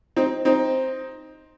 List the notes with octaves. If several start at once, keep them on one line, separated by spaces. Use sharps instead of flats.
C4 D#4
C4 D#4